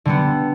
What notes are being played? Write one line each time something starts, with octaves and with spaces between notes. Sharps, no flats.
D3 G3 B3